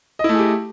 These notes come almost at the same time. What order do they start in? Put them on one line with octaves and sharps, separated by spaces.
D#5 E4 A3 G#4 G4